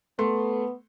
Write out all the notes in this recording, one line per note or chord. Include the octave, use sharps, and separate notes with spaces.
A3 B3 C6